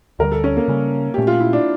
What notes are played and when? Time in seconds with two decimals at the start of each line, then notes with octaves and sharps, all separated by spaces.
0.19 D2 D3 G3 A#4
0.32 A4
0.44 C#4
0.57 A#3
0.68 C#3 G3 C#4
1.14 A#2 A3 C#4 G4
1.27 F4
1.40 E4
1.53 D4